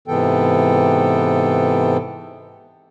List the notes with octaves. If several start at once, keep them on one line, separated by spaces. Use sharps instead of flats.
G#2 C3 E3 B3 A4 G5